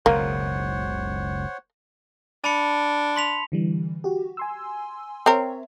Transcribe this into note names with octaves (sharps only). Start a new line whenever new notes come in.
F#1 C#2 B2 A#3 C5 C#5 F#5
D4 A5 B5 C#7
C6 B6 F7
D3 E3 G3
F#4 G4
G#5 C6 E6
C4 A#4 C#5 E5